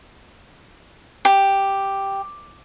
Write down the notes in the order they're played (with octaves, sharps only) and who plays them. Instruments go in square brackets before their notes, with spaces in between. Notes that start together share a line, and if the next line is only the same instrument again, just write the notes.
[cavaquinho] G4